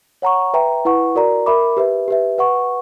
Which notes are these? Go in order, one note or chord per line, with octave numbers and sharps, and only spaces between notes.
C#5 F#5 A#5 C#6
B4 E5 G5 A#5
E4 B4 F#5 C#6
F#4 A#4 D5 A#5
A#4 E5 B5 D6
G4 B4 E5
G4 B4 E5
B4 F#5 C#6